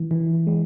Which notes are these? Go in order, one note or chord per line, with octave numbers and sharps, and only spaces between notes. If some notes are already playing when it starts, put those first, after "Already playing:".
Already playing: E3
E3
G#3